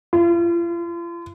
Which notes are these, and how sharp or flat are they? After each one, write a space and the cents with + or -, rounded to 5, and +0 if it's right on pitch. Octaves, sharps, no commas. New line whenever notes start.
F4 -40